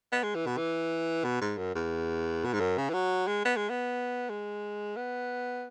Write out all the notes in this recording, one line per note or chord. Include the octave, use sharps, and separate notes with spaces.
B3
G#3
E3
B2
E3
B2
G#2
F#2
E2
B2
G#2
F#2
C#3
E3
F#3
G#3
B3
G#3
B3
G#3
B3